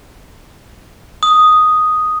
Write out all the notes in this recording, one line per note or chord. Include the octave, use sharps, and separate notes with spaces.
D#6